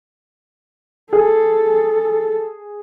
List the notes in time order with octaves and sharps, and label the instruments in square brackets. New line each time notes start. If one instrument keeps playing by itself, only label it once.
[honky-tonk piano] G#4 [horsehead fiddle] A4